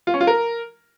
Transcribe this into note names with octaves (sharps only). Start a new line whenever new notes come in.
F4
C#4
F4
A#4